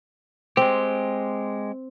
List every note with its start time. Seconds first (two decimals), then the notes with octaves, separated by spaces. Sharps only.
0.57 G#3 C4 G4